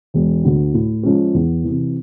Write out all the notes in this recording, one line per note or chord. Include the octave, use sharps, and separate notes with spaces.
E1
D2 D3
A2
F3 G#3 C#4
E2
C3 E3